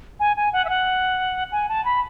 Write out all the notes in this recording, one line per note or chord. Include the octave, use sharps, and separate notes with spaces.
G#5
G#5
F#5
E5
F#5
G#5
A5
B5